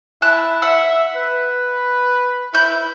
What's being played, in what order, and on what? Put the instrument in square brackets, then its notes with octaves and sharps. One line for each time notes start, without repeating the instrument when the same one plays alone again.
[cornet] E4 [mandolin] A5 F#6
[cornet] E5 [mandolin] F#5 E6
[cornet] B4
[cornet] E4 [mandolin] B5 G6